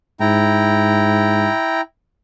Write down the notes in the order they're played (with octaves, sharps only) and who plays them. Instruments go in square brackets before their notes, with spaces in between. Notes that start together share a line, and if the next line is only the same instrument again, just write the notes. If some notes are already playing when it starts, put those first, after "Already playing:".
[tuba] G#2 [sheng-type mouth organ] E4 G5 A#5